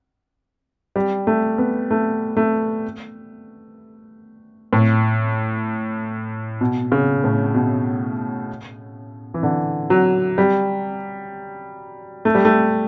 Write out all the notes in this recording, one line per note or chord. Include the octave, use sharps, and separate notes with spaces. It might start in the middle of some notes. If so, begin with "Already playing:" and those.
G3
A3
B3
A3
A3
A2
B2
C#3
A2
B2
E3
D3
F#3
G3
A3
G3
A3